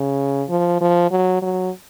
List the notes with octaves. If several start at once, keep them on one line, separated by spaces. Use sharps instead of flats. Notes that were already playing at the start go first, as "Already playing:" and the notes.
Already playing: C#3
F3
F3
F#3
F#3